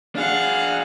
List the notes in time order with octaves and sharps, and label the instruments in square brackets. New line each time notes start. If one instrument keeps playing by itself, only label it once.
[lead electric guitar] D4 G#4 [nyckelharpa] F5 F#5